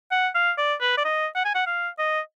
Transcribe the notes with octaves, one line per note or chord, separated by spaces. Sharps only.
F#5
F5
D5
B4
D5
D#5
F#5
G#5
F#5
F5
D#5